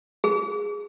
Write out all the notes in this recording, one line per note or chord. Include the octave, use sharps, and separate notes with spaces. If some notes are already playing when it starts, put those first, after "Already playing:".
G#4